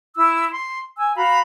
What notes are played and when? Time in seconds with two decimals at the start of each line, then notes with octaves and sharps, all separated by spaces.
0.16 E4 E6
0.51 C6
0.98 G#5 E6
1.15 F#4 F5 A#5 B5